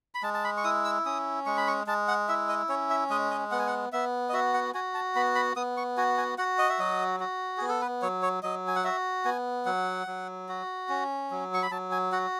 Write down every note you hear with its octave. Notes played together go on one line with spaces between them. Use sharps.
B5
G#3 A5
A5
B5
C#6
E4 D#6
E6
C#4 D#6
G#3 C#6
B5
C#6
G#3 A5
F#5
E4 E5
D#5
C#4 C#5
E5
G#3 D#5
D#5
B3 F#5
G#5
F#5
B3 E5
D#5
F#4 E5
F#5
F#4 G#5
A5
B3 B5
B5
B3 D#6
C#6
F#4 G#5
G#5
F#4 F#5
D#5
E5
F#3 D#5
F#4
B3 G#4
A4
B4
F#3 C#5
C#5
F#3 D#5
G#5
F#5
F#4 E5
B3 G#5
F#3 F#5
F#3
F#4
C#4
F#3
C#6
B5
F#3 A5
G#5
F#4 F#5